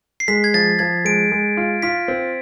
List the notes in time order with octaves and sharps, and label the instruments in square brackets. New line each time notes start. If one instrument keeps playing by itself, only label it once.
[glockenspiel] C7
[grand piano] G#3 [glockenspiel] B6
[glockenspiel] G#6
[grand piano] F3 [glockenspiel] A6
[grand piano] F3 [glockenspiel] G#6
[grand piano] G#3 [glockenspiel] D7
[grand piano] G#3
F4
[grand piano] F4 [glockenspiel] B6
[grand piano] C4